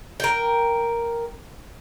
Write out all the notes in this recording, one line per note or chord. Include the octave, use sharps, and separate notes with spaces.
A#4 G5